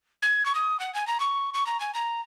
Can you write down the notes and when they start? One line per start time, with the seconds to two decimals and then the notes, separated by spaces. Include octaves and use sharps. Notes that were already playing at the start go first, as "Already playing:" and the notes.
0.22 G#6
0.46 C#6
0.55 D#6
0.80 F#5
0.94 G#5
1.07 A#5
1.20 C#6
1.54 C#6
1.67 A#5
1.80 G#5
1.94 A#5